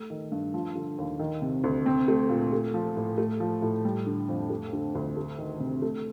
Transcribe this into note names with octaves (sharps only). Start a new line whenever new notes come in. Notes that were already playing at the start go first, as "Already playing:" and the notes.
Already playing: A3
D#3
G2
F3
D3
D#2
D#3
C3
D2
C4
A3
A#2
A3
F3
A2
A3
F3
A2
G3
D3
F2
A3
D3
D2
A3
D#3
C3
A3